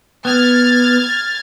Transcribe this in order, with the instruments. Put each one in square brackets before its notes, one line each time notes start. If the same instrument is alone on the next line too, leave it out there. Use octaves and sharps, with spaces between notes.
[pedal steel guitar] B3 [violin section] F6 G#6 A6